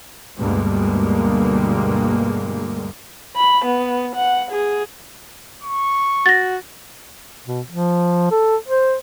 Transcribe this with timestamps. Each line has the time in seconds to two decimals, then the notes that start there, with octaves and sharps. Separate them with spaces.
0.38 D2 G2 B2 G3 G#3 A#3
3.36 B5
3.65 B3
4.16 F#5
4.51 G#4
5.63 C#6
6.26 F#4 A6 A#6
7.46 B2
7.70 F3
8.31 A4
8.68 C5